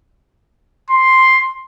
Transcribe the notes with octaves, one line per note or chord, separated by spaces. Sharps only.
C6